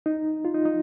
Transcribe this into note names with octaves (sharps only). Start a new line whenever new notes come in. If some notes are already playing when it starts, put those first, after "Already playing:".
D#4
F4
D#4
D#4